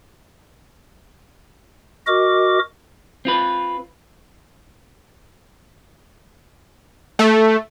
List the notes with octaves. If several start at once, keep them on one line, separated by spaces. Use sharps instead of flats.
F#4 A#4 D#5 D6
C4 F4 B4
A3